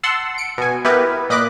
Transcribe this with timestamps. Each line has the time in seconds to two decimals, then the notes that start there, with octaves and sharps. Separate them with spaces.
0.03 F#5 A5 C6 E6
0.38 C#7 D7
0.58 B2 G#5
0.85 B3 E4 G4 A#4 B4
1.30 A#2 D#5 B5 D6 F#6